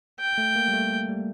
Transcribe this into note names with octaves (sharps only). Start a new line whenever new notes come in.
G5
A3
A#3
G3
A3
G3